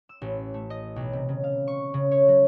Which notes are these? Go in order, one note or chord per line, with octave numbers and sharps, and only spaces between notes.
E6
A1
A3
D#5
B1
C3
C#3
F5
C#6
C#3
C#5
F#3